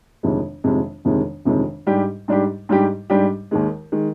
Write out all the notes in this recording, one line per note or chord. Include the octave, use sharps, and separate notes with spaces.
G1 F2 C3 D#3 G#3
G1 F2 C3 D#3 G#3
G1 F2 C3 D#3 G#3
G1 F2 C3 D#3 G#3
G#2 G3 D4 G4
G#2 G3 D4 G4
G#2 G3 D4 G4
G#2 G3 D4 G4
D#2 D#3 G#3
D#3 G#3